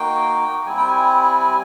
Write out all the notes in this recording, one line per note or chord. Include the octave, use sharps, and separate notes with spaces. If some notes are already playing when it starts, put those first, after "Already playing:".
Already playing: A#3 D#4 F#4 G5
G3 C4 E4 G#5
G5
G#5